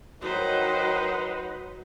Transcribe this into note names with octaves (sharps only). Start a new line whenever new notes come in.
D#3 F#3 D#4 B4 C5 F#5